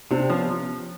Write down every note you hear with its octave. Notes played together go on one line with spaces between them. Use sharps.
C3 C4 D4
F3 B3 C#4